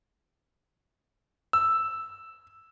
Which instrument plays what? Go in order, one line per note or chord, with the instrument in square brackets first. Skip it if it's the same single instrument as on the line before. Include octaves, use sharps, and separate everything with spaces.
[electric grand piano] E6